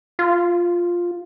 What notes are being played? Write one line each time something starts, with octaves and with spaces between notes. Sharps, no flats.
F4